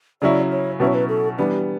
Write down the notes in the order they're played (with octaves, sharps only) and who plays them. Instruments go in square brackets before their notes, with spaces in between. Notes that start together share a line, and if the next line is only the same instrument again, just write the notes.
[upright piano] C#3 F#3 C#4 E4 [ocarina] D5
[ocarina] C#5
[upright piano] B2 F#3 C#4 E4 [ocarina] B4
[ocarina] C#5
B4
A4
[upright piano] E3 G3 B3 D4 [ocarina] G4